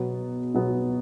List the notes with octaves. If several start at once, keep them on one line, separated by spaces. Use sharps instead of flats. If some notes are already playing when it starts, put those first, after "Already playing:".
Already playing: B2 F#3 B3
B2 F#3 B3